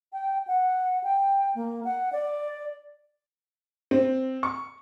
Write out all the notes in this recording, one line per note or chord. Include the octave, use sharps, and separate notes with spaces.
G5
F#5
G5
A#3
F#5
D5
C4
C#6